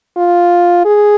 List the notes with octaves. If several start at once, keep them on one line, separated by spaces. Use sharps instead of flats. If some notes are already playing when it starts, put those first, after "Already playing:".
F4
G#4